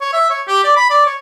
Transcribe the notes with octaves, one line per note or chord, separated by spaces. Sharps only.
C#5
E5
C#5
G4
D5
B5
D5
C#5